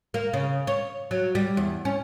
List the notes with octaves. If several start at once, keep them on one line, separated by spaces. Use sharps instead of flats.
A#3
C#3
C#5
F#3
G3
E2
C#4